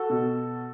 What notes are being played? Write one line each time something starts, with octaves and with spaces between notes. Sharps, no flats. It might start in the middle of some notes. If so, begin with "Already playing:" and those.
Already playing: F#4 A4
B2